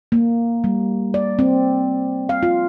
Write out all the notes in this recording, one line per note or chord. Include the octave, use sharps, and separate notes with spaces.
A#3
G3
D5
C4
F5
F4